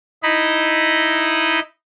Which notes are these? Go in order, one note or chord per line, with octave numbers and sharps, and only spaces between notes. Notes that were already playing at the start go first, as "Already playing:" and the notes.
D#4 E4 D#5 B5